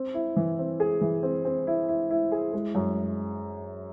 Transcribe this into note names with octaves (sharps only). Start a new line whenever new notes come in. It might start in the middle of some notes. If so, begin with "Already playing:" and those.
Already playing: C4
E4
E3
C4
G#4
E3
C4
C4
E4
E4
E4
G#4
G#3
F#2